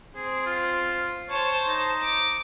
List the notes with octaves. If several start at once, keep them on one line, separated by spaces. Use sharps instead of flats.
C4 G#4
F4
C5 C#5 A5
D#4
D6